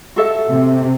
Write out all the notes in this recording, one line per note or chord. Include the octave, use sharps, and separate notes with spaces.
F#4 A4 E5
C3